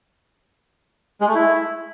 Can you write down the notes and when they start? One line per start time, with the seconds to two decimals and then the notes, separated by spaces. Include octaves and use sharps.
1.21 G#3
1.28 A3
1.35 E4